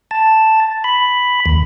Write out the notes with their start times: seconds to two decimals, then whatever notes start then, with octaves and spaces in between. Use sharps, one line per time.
0.11 A5
0.84 B5
1.46 D#2